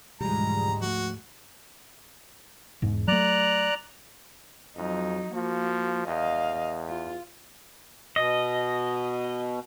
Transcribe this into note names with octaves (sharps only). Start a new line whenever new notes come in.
D2 G#2 B2 E3 F3 G3 G#3 A#5
F3 F#3 A3 F#4
E1 G#2
F#3 A3 D5 A#5 F#6
F2 F#3 D#4
F3 A#3 F#4
E2 D#5 F5
F4
B2 D#5